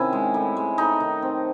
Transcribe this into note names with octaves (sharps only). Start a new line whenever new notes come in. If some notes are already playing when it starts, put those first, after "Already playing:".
Already playing: C3 D#3 C#4 E4
G#3
A2
G#3
A3 D#4
D#3
C4